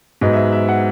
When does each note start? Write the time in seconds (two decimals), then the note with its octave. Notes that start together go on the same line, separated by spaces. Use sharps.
0.21 G#2 F#3 B3 D#5
0.33 E5
0.37 D#5
0.52 E5
0.69 F#5